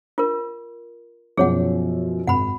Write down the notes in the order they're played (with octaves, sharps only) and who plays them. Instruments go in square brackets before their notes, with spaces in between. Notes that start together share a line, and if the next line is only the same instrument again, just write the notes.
[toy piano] F4 A#4
[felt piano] F#2 B2 F3 [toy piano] G#4 C#5 F#5
[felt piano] G#1 [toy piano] F#5 B5